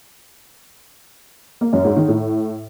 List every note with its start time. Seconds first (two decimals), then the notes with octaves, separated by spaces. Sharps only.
1.61 A#3
1.73 F#2
1.85 G#2
1.96 D#3
2.08 A2